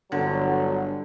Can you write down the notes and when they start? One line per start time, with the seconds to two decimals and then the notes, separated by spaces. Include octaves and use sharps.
0.12 G1 D3 F#3